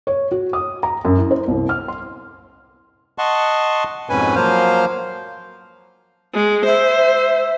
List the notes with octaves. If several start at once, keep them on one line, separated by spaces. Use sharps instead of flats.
C#5
F#4
D#6
A#5
F#2
E4
C5
C2
F6
C6
D#5 F#5 A5 C6 C#6
F2 G#2 B2 C#4 B4 G#5
F3 F#3 A#3 C5 F5
G#3
C5 E5